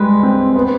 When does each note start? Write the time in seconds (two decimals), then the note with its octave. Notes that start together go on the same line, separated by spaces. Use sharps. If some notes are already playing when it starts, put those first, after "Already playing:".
Already playing: G3 G#3 G#4 B4
0.23 C4
0.55 B3